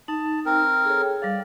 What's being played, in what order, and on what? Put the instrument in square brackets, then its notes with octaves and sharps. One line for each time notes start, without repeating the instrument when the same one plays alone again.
[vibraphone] D#4 [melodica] A5
[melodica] C4 A#4
[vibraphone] G#4 A4 C#5
[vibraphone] G3 F5 [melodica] D5